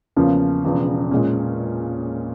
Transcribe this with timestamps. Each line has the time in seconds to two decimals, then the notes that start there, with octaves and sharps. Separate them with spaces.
0.16 E2 C#3 F3 A#3 C#4
0.64 E1 E2 C#3 F3
1.11 A#2 G#3 C#4